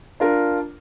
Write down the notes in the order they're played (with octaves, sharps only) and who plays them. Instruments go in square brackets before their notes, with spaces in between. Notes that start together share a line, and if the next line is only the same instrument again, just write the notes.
[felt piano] D4 F4 A#4